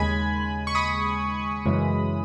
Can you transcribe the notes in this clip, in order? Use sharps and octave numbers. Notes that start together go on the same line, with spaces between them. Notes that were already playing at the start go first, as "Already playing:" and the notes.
Already playing: D#2 C#3 G#3 G#5 B5
C#6
B5 D#6
F#2 C#3 E3 G#3